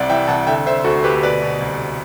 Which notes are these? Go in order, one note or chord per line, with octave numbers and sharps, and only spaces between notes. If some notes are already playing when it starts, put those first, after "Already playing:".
Already playing: C2 C3 D5 F#5
E3 E5 G5
C2 F#5 A5
D3 E5 G5
D3 C5 E5
D2 F#4 A4
D2 G4 B4
B2 B4 D5
B2
C2